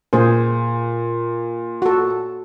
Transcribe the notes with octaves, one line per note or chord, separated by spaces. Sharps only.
A#2 G#4 C5
F#4 A4